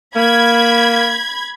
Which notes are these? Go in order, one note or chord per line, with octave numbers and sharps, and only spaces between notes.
A#3 B5 G#6